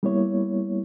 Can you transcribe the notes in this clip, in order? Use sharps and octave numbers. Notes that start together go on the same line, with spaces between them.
G3 A#3 B3 E4 C#5